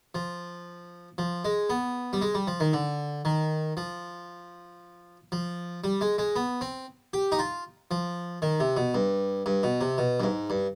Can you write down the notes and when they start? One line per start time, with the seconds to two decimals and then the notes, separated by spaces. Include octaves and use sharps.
0.15 F3
1.18 F3
1.45 G#3
1.70 B3
2.13 G3
2.22 G#3
2.35 G3
2.47 F3
2.60 D#3
2.73 D3
3.25 D#3
3.77 F3
5.32 F3
5.84 G3
6.01 G#3
6.18 G#3
6.36 B3
6.61 C4
7.13 G4
7.32 D#4
7.39 F4
7.91 F3
8.42 D#3
8.60 C3
8.77 B2
8.94 G2
9.46 G2
9.63 B2
9.81 C3
9.98 B2
10.20 G2
10.23 G#2
10.50 G2